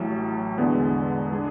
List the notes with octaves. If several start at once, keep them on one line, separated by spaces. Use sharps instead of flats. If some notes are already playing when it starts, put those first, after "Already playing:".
Already playing: A1 A2 F#3
E2 D3 G#3 B3
G#3 D4 G#4